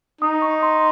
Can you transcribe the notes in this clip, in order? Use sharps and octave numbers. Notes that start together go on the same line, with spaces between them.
D#4 D#6
C#6
C6